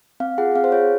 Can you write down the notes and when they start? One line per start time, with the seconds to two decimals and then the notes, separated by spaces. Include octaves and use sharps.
0.20 C4 F5
0.38 F4 G#4 F#5
0.55 C4 F5
0.64 C5
0.72 F4 G#4 C#5